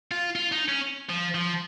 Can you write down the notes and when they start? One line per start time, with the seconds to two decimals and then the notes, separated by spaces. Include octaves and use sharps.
0.11 F4
0.36 F4
0.52 D#4
0.69 C#4
1.10 F3
1.35 F3